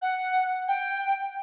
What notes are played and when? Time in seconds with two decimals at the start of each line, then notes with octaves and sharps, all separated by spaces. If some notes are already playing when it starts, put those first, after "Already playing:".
0.02 F#5
0.68 G5